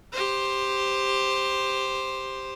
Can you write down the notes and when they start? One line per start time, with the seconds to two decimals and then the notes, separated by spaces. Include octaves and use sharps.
0.12 G4 C5